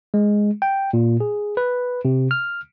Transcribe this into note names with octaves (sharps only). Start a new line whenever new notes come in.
G#3
G5
A#2
G#4
B4
C3
F6